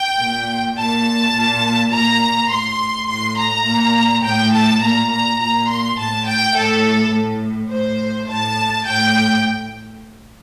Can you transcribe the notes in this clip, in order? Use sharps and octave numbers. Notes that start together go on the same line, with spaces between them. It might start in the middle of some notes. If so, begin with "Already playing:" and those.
Already playing: G5
A#2
A#2 A5
A#2
A#2 A#5
A2 C6
A2 C6
A#5
A#2
A2 G5
A5
A#2 A#5
A#5
A#2 A#5
C6
A2 A5
G5
A2 A4
A2
A2 C5
A2 A5
A2 G5